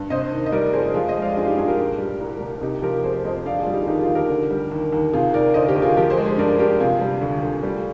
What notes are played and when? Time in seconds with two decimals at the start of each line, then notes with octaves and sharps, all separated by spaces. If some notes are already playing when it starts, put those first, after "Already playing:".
Already playing: G2
0.10 C3 C5 D#5
0.32 D#3
0.46 D#5
0.52 G3 A#4 D5
0.73 F2 G#4 C5
0.94 F3 F4 G#4
1.08 C5 D#5
1.15 G#3
1.22 D5 F5
1.36 G2 F4 G#4
1.46 D#4 G4
1.57 G2 F4 G#4
1.68 G4 A#4
1.78 A#2
1.99 G3
2.21 C2
2.40 C2
2.61 C3 D#4 G4
2.82 F3 G4 A#4
3.04 F2 G#4 C5
3.24 F2 C5 D#5
3.45 D3 D5 F5
3.59 F4 G#4
3.67 G3
3.74 D#4 G4
3.82 G#4
3.87 D#2 D#4 G4
4.01 F4 G#4
4.09 D#2
4.15 G4 A#4
4.29 D3
4.51 G3
4.71 D#2
4.92 D#2
5.13 C3 F4 G#4
5.33 D#3 A#4 D5
5.54 D2 C5 D#5
5.68 G4 A#4
5.75 D2
5.82 F4 G#4
5.97 F3 G4 A#4
6.10 G#4 C5
6.17 G#3
6.25 G#4 C5
6.38 G2 A#4 D5
6.59 G2 G4 A#4
6.80 C3 F4 G#4
7.01 G3
7.21 D2
7.43 D2
7.63 G3